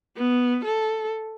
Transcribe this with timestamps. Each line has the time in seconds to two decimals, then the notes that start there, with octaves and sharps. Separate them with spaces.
0.16 B3
0.64 A4